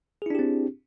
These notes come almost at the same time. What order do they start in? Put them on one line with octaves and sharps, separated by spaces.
G#4 E4 D4 G4 C4